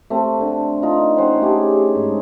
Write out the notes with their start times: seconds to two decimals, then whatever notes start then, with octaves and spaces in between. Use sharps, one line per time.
0.10 A3 C4
0.40 D3
0.82 D#4 F4
1.17 C#4 C5 F#5 G5
1.41 A3 G4 G#4
1.95 G#2